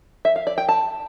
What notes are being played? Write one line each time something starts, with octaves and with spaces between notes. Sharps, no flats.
E5
F5
D5
G5
A5